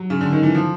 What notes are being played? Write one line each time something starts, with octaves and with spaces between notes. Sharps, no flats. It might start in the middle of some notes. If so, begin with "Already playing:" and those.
Already playing: F#3
C#3
D3
D#3
E3
F3